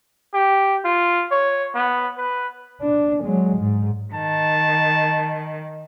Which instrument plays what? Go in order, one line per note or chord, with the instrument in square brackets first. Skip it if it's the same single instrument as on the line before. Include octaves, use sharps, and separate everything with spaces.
[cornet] G4
F4
C#5
B3
B4
[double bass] D4
F#3 G#3
G#2
[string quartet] D#3 [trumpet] A5